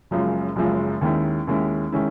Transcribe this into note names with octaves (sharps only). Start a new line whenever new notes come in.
F#1 F#2 C#3 F3 G#3
F#1 F#2 C#3 F3 G#3
D#2 D#3 G#3 C#4 E4
D#2 D#3 G#3 C#4 E4
D#3 G#3 C#4 E4